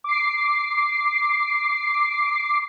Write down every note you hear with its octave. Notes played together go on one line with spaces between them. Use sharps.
D6 C7